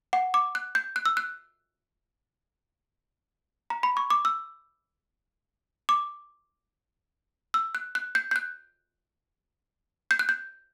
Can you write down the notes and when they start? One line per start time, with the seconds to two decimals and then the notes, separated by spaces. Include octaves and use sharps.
0.13 F#5
0.34 D6
0.55 F#6
0.75 G6
0.96 F#6
1.06 E6
1.17 F#6
3.70 A#5
3.83 B5
3.97 C#6
4.10 D6
4.25 E6
5.89 D6
7.54 E6
7.75 F#6
7.95 F#6
8.15 G6
8.31 G6
8.36 F#6
10.11 G6
10.19 F#6
10.29 G6